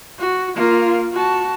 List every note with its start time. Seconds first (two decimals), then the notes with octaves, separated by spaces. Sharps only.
0.19 F#4
0.56 A#3 F4
1.12 F#4 A5